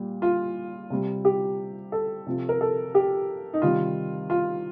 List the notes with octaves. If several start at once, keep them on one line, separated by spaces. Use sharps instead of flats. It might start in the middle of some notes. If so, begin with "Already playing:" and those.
Already playing: A#2 G3
F4
C3 G3
G4
A4
C3 F3
A#4
A4
G4
D#4
C3 D#3 G3 F4
F4